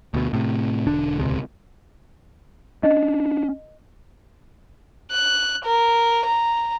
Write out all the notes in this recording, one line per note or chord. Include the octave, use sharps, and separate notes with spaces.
D2 B2
A2 C3
E1 D3 D4
D#1 C#2 C3
C#4 D4 D#5
F#6
A#4
A#5